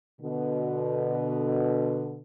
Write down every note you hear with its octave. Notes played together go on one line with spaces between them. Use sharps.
B2 D3